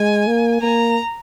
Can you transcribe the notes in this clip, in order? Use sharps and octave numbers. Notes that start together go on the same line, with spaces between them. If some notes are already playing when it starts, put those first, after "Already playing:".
Already playing: G#3 G#5
A#3
A#3 A#5